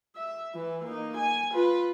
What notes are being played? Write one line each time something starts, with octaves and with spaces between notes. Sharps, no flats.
E5
E3
A#3 D#4
G#5
F4 B4